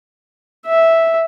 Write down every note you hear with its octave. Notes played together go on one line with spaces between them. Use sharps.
E5